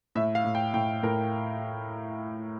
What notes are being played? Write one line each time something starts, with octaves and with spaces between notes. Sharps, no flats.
A2 E5
F5
A2
G5
A2 G5
A2 A#4